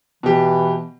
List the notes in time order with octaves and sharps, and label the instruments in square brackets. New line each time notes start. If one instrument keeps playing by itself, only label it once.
[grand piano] B2 G4 [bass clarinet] E3